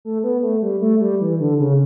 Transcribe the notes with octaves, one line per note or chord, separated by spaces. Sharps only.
A3
B3
A3
G3
A3
G3
E3
D3
C#3